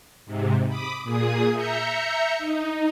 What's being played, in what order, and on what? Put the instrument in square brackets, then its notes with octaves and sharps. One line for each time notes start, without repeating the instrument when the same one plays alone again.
[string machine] G#2 C3
B5 D6 D#6
A#2 G#4 D#6
E5 A#5 G6 C#7
D#4